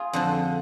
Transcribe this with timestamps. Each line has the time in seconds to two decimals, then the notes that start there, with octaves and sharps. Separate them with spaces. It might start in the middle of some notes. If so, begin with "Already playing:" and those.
Already playing: F4 G#4
0.13 F2 D3 F3